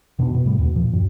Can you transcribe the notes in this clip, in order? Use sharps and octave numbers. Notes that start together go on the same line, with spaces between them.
F2 B2 B3 D4
B2
A2 C3 G3
D#2 B2
A#2 F3
F#2